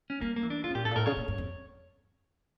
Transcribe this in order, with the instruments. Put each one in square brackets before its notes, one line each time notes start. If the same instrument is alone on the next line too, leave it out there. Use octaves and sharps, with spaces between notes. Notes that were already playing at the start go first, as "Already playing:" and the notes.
[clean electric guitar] C#4
[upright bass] G3 [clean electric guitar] A#3
[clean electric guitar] A#3
[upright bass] E3
[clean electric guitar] D4
[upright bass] D3 [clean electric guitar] F4
[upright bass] C#3
[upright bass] A#2 [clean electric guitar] G4
[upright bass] A2 [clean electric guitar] A4
[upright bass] A#2
[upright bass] A2 [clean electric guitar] A#4
[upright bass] C#3 [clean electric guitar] C#5
[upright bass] A#2
G2
F2